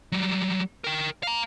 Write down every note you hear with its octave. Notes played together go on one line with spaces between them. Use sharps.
F#3 G3
A#4 G5
F5 A#5